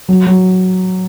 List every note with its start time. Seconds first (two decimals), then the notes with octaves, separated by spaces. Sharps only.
0.09 F#3
0.27 F#3